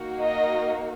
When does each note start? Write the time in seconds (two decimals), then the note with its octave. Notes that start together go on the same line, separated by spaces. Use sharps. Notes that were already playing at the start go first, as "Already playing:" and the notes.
Already playing: A#3 D#4 F#4
0.19 D#5